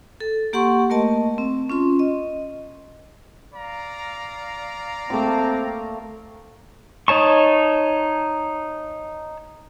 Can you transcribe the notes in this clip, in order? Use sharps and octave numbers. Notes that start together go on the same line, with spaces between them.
A4
A#3 G4 F#5 C6 C#6
A3 A#3 A#4 D#5 A5
C4
C#4 F4 C6
D#5
D5 F5 A#5
A3 A#3 C4 D6
D#4 C#5 A5 C#6